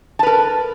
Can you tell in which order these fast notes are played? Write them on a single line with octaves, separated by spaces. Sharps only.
A5 B4 A#4